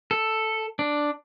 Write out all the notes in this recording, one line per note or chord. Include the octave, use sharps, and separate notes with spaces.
A4
D4